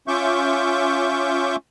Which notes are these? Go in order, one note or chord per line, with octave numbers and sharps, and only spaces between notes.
C#4 F4 E5 C#6 D6 G6